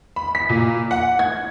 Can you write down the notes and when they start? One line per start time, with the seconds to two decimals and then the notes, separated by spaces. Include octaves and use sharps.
0.16 B5
0.35 B6
0.49 A#2
0.91 F#5
1.19 G#6